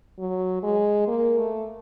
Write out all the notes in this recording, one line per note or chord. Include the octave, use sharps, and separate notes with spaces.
F#3
G#3
A#3
A3